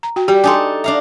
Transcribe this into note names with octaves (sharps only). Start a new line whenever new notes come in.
A#5
F#4 G5
G3 G4
D4 D#4 A4 G#5 C6
D4 E5 F5 A#5